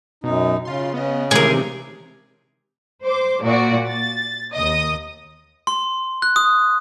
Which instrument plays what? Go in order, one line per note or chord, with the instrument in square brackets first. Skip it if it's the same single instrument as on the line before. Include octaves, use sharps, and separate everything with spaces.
[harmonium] F#2 D#4 [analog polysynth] B2
[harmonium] C#3 [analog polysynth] F4 C6
[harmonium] C#3 [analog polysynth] B3 D#5
[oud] D2 C3 [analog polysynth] D#3 E3 G#3 [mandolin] G#4 A#4
[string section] C5 D6
A#2 F#4 D5
A6
D#2 D#5 D#6
[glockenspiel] C6
F#6
D#6